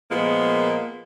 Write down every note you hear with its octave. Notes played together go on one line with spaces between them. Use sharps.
A#2 F3 G#3 A#3 B3